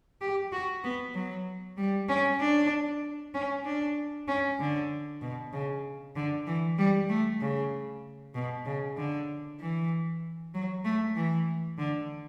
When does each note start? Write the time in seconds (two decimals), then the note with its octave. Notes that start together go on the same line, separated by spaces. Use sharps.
0.21 G4
0.52 F#4
0.84 B3
1.14 F#3
1.78 G3
2.09 C#4
2.40 D4
3.34 C#4
3.65 D4
4.28 C#4
4.59 D3
5.22 B2
5.53 C#3
6.16 D3
6.46 E3
6.78 G3
7.09 A3
7.41 C#3
8.34 B2
8.66 C#3
8.97 D3
9.60 E3
10.54 F#3
10.85 A3
11.16 E3
11.78 D3